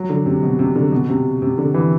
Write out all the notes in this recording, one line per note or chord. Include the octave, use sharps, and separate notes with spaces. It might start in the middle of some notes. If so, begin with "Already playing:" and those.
Already playing: F#3
D3
C3
B2
C3
D3
B2
C3
C3
D3
E3